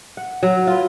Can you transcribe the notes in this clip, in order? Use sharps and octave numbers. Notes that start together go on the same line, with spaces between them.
F#5
F#3
F4 B4